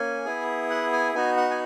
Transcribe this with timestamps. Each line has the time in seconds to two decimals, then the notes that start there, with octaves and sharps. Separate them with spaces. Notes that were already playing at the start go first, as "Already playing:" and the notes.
Already playing: A#3 C#4 G#5
0.25 B3 E4 G#4
0.70 F#5
0.93 G#5
1.14 B3 D#4 F#4 G#5
1.37 F#5
1.50 G#5